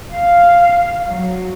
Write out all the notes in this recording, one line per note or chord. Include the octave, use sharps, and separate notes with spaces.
F5
F#3